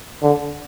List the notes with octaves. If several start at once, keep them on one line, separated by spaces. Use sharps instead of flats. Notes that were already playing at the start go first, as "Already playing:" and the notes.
D3